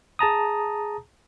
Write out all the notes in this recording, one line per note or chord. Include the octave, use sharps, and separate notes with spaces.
G#4 A5 A#5 D#6